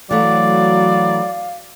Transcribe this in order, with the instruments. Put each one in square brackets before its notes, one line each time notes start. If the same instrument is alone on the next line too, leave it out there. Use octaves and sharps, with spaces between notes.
[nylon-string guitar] E3 A3 [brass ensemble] F#3 [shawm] D5 [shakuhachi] F5